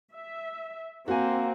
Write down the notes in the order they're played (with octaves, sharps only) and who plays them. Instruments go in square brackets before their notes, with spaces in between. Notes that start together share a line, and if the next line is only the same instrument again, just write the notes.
[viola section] E5
[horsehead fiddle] A#3 [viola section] C4 [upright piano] F#4 G#5